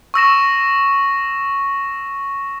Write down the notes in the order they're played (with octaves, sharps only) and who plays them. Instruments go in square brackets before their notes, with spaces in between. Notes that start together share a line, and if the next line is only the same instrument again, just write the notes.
[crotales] C#6 E6 A#6 E7